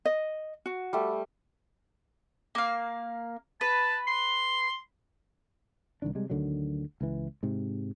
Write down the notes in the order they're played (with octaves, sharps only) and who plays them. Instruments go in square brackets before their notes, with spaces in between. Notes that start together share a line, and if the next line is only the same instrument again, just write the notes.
[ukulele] D#5
F#4
[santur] G3 A3
[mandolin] A#3 F5
[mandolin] B4 [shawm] A5
[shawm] C6
[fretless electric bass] C2 D#3 D4
C3 G3 G#3
D2 D3 D#3 F#3
C#2 E3
G#2 C3